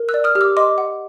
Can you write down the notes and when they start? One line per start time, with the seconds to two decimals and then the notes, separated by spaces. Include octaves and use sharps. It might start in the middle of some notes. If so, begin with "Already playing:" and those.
Already playing: A#4
0.09 E6 F#6
0.14 D5
0.24 D#6 F6
0.35 G4 F6
0.41 D6 E6
0.57 D#5 C6 D6
0.78 F#5